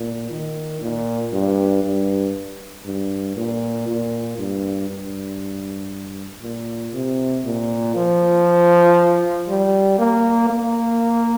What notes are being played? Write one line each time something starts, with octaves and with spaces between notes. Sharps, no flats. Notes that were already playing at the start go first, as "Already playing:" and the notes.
Already playing: A#2
D#3
A#2
G2
G2
G2
A#2
A#2
G2
G2
A#2
C3
A#2
F3
G3
A#3
A#3